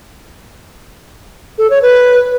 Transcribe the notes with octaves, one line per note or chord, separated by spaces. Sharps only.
A4
C#5
B4